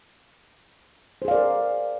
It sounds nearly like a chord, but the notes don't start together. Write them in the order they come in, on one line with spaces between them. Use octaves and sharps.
C5 G#4 F5 D5 A#4